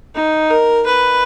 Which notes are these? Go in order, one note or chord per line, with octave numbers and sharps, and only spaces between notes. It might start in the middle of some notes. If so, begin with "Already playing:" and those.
D#4
A#4
B4